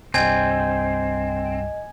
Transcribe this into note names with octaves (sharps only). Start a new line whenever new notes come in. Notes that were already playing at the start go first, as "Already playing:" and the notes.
C2 G2 G3 C4 D#5 G#5 G#6